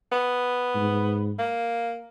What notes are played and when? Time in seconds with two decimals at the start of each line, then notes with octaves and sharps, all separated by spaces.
0.12 B3
0.75 G#2
1.39 A#3